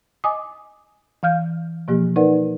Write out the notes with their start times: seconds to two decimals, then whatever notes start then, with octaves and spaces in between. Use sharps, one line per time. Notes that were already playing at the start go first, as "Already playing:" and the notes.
0.24 D#5 G#5 D6 D#6
1.23 E3 F5 F6 G6
1.88 B2 F3 A#3 G4
2.16 D#4 A#4 B4 D5 F#5